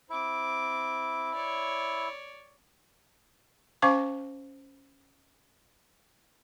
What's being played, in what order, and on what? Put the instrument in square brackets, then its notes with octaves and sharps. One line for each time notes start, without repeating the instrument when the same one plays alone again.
[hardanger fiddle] C4 D6 [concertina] E4
[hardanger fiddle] C#5 D5
[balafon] C#4 C5 F5 A5 C#6 D6